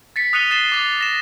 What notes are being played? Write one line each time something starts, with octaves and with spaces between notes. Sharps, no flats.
A6 B6 C#7
D#6 F#6 C#7 D#7 F7 G7
A6 C7 E7 G7
D6 A6
A#6 E7